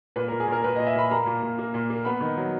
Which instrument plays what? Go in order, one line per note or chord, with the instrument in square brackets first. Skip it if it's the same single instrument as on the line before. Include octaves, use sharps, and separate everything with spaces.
[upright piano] A#2 B4
A#4
A#2
G#4
A#2 A#4
A#2 B4
D#5
A#2
E5
A#2 B5
A#3 A#5
A#2
A#2
A#3
A#2
A#3
B3 B5
D#3
F#3